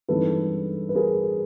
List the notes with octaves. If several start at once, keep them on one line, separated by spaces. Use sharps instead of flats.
G2 E3 G#3 C4 D#4 A4 B4
B4
G#4 A#4